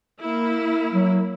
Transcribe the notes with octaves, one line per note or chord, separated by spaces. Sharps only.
A#3 E4
F#3